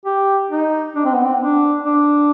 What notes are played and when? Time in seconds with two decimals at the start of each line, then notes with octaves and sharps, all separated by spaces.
0.05 G4
0.51 D#4
0.96 D4
1.05 C4
1.14 B3
1.24 C4
1.41 D4
1.85 D4